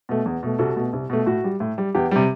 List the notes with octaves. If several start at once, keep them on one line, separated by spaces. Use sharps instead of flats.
B2 A3
E2
B2 A3
C2 F#4 A4
B2 A3
C2
B2 A3
A2 F#4
G3
A2
G3
E2 G4
C3 G3